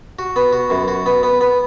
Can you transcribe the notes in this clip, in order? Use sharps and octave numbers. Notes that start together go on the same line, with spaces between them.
F#4
B3
F#4
F#2
F#4
B3
B3
B3